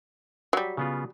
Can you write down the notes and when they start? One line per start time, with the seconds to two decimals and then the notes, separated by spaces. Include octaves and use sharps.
0.53 F#3 G3
0.77 C#3 B3 F4